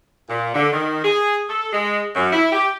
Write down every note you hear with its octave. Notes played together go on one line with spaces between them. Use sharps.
A#2
D3
D#3
G#4
A4
G#3
F#2
E4
G4